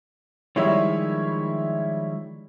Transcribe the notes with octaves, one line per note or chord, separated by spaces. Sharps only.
D#3 F3 G3 G#3 E4 C#5